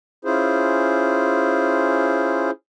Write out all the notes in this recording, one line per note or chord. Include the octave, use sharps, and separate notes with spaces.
C#4 E4 F4 G#4 C5